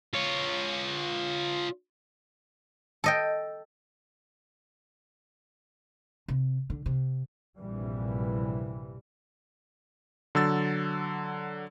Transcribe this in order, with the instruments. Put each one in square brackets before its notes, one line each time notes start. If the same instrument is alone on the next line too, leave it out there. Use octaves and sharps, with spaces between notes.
[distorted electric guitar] F4 C#5
[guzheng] A4 D#5 G5
[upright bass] C3
D3
C3
[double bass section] A#1 G2 C3 E3 G3
[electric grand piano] D3 F#3 E6 A6